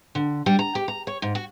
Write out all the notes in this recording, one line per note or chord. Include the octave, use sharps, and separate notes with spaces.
D3
G3
A#5
G4
A#5
C#5
G#2
F#4